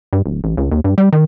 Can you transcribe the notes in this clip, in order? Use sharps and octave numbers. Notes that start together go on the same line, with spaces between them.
G2
D1
A1
C#2
D#2
G2
G3
D#3